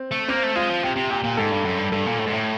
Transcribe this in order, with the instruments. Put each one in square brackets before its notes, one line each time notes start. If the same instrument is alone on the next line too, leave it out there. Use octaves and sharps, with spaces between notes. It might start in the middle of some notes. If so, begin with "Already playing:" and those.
Already playing: [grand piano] C4
[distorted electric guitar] A3
[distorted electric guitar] A#3 [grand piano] C4
[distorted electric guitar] A3
[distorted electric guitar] G#3 [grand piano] F4
[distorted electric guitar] F3
[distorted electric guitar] C3 [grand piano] G4
[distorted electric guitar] C3
[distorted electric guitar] A#2 [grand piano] G4
[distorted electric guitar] A#2
[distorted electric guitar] G#2 [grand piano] A4
[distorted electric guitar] G2
F#2
G2
[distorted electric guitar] G2 [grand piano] A4
[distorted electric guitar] A#2
A2
G#2
A2